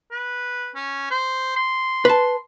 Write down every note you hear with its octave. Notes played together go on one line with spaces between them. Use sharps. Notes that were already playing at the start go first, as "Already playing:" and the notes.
B4
C#4
C5
C6
B4 A5